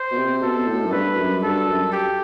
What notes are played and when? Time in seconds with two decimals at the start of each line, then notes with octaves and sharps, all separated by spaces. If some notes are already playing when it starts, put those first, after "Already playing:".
Already playing: C5
0.11 B2
0.17 C3
0.42 B2 A4
0.67 A2
0.85 F#2
0.92 G2 B4
1.17 F#2
1.42 G2 A4
1.68 F#2
1.92 G4